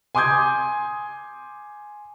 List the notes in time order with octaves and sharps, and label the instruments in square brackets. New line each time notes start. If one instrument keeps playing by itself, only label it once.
[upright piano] G#5 C6 D6 D#6 G6 G#6